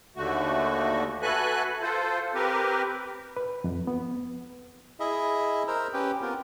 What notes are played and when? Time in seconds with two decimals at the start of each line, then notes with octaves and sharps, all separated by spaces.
0.16 D#2 D3 A3 F#4
1.22 F#4 A4 B4 E5 G#5 F#6
1.82 F4 A4 C5
2.34 C4 G4 A#4 B4
3.37 B4
3.64 F2
3.87 B3
5.00 E4 G#4 D#5 E5
5.68 A#4 C5 A#5 E6
5.93 C#4 G4 B4 G5
6.22 B3 C4 F4 A#4